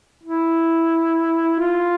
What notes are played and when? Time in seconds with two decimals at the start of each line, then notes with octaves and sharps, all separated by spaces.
0.23 E4
1.59 F4